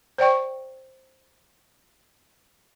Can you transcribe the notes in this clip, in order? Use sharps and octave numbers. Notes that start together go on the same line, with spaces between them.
C5 D5 G5 C#6